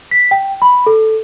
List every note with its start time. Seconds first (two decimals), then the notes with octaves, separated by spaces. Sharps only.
0.11 B6
0.31 G5
0.62 B5
0.87 A4